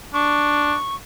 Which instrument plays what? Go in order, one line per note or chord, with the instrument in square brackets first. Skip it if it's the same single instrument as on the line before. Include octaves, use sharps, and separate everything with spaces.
[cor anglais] D4 [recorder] C#6